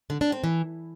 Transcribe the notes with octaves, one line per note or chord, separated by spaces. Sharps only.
D3
D4
C4
E3